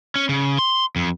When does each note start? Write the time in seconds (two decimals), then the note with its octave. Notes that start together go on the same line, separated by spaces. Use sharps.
0.16 C#4
0.29 C#3
0.59 C6
0.96 F2